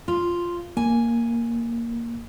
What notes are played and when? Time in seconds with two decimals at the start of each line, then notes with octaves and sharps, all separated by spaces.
0.08 F4
0.77 A#3 G#5